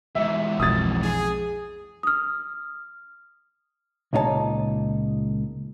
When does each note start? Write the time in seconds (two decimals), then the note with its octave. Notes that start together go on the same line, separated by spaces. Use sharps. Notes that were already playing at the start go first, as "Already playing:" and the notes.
0.15 E2 G#2 E5
0.60 B1 F2 D#6 A6
1.03 G#4
2.03 D#6 F6
4.13 C#2 A#2 D#4 F4 C#5 A5